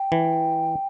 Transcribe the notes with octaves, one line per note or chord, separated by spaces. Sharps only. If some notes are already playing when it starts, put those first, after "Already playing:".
Already playing: G5
E3